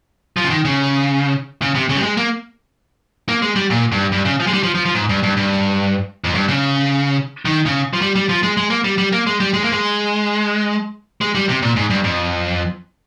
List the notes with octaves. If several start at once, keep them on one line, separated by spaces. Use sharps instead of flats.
F3
C#3
D#3
C#3
C#3
C3
C#3
G3
G#3
A#3
A#3
G#3
G3
A#2
G2
G2
C#3
F3
G#3
G3
F3
F3
F3
G#2
G2
G2
G2
F2
G2
C#3
D#3
C#3
F3
G3
G3
F3
G#3
G#3
A#3
G3
G3
A#3
G#3
G3
G#3
A#3
G#3
G#3
G3
C3
A#2
G#2
G2
F2